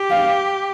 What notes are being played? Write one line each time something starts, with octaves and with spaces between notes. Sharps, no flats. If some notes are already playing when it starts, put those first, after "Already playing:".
Already playing: G4
F5